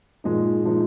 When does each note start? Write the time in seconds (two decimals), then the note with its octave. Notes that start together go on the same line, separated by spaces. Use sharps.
0.24 A#2 F3 G#3 D#4
0.63 A#2 F3 G#3 D#4